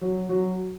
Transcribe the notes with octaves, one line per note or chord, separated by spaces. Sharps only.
F#3
F#3